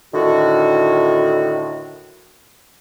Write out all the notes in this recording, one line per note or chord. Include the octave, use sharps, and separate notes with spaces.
A2 D3 D#3 F#4